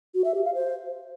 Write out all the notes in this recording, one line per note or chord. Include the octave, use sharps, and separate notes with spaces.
F#4
E5
G4
F5
C5